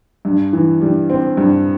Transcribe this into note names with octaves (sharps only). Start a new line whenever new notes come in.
G2
E3
G3
C4
G2